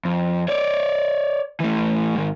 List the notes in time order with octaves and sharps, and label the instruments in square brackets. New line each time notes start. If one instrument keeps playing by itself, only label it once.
[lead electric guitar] F2
C#5 D5
E3 A3
G#2 D#3